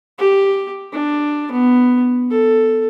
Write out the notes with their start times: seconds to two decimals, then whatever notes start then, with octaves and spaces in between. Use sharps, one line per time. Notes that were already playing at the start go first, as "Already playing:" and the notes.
0.18 G4
0.93 D4
1.52 B3
2.30 A4